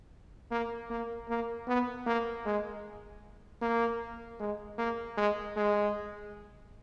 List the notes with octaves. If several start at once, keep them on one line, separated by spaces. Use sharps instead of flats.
A#3
A#3
A#3
B3
A#3
G#3
A#3
G#3
A#3
G#3
G#3